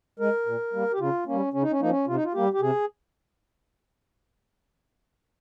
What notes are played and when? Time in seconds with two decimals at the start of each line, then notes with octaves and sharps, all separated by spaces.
0.19 G#3 A#4
0.46 A#2
0.73 G3 A#3
0.93 G4
0.99 C#3 F4
1.27 G3 A#3 C#4
1.53 C#3 C#4
1.62 D#4
1.71 C#4
1.80 F3 A#3 D#4
1.90 C#4
2.07 C3 F4
2.15 D#4
2.24 F4
2.34 G3 A#3 G4
2.53 G4
2.61 C3 G#4